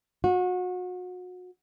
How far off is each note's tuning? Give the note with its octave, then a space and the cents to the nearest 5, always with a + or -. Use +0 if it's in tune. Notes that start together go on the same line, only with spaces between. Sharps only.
F#4 -30